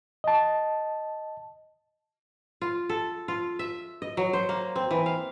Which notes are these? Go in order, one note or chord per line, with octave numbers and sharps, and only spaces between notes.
D#5 A5
F4
A4
F4
E5
D#5
F#3
C5
A#3
C4
E3
F5